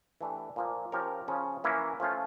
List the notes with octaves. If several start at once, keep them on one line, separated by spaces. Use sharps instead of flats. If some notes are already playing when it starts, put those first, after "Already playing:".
E3 A3 D4 G4
A#2 F3 A#3
F3 C#4 G4 A#4 C#5
C#3 F3 C#4
E3 A#3 C#4 E4
F3 A3 C#4 F4